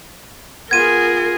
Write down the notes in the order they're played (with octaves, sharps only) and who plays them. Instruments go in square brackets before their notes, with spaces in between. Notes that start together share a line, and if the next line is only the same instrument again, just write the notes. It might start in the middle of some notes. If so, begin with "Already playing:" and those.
[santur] B3 F4 F5 [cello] G#4 A#4 [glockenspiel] G#6 D#7